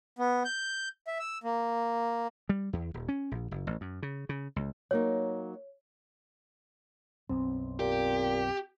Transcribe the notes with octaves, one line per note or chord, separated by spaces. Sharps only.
B3
G6
E5
E6
A#3
G3
E2
D#1
C#4
A#1
F#1
A1
F#2
C#3
C#3
C#2
F#3 A#3 D#4 C#5
B1 F#2 C4
A#2 G4